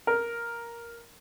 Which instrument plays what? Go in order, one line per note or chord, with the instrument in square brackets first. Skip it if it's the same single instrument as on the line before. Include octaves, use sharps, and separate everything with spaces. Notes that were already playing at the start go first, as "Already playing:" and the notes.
[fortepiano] A#4